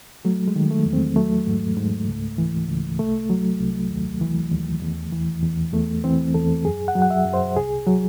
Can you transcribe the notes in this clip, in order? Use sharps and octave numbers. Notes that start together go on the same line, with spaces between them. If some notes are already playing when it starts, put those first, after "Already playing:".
F#3 A3
G#3
D#3
A3
E2
C4
F#3 A3
G#2
G#2
C#2
E3
C#2
C2 A3
F#3
C2
D#2
E3
D#2
E2
E3
E2
E2 A3
E3 C4
E2 A4
F#2 G#4
F#5
F#3
F#5
E5
F#2
C5
C2 G#4
F#3